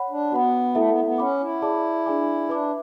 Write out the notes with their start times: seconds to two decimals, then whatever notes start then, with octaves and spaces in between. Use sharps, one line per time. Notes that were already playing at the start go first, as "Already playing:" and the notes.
Already playing: C#5 F#5 B5
0.10 D4
0.32 B3 F#4 B4 F#5 B5
0.75 A3 E4 A4 E5
0.90 B3
1.04 B3
1.18 C#4 C#5 F#5 B5 D6
1.41 E4
1.62 G#4 D5 A5 D6
2.06 D4 G#4 D5 G#5 D6
2.49 D4 B4 E5 B5 D6